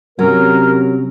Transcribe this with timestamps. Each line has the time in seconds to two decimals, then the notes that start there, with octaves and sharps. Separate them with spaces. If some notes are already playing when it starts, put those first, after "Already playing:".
0.19 C3 F#3 C#4 A#4